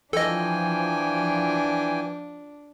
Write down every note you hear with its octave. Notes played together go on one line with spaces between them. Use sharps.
E3 F3 D4 A4 D#5 G5 G#5